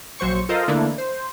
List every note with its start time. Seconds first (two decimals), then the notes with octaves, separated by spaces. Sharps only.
0.19 A#1 F#3 C5 C#6 C#7
0.49 F4 A4 A#4 C5 D#5 F5
0.68 D3 E3 A3 A#3 D4 E4
0.98 C5